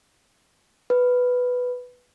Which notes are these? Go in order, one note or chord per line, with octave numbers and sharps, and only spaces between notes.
B4